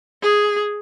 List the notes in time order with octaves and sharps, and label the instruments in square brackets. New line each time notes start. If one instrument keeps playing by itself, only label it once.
[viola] G#4